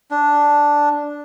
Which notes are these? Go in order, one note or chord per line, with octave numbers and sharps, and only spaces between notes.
D4